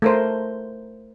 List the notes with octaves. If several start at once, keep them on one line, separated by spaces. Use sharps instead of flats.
A3 A#4 C5